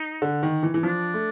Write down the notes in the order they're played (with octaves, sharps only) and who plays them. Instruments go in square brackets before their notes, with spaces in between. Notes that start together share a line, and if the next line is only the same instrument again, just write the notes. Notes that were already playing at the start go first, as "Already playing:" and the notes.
Already playing: [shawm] D#4
[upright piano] D3
D#3
E3
E3
[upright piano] F3 [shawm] D4
[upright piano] A3